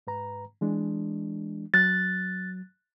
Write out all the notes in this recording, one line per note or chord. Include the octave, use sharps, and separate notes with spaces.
G#2 B4 A#5
E3 G#3 D4
F#3 F#6 A6